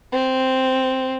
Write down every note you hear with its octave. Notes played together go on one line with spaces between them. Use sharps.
C4